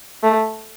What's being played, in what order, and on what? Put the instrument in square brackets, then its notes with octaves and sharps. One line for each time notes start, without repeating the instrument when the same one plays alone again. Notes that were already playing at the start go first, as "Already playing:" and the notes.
[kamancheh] A3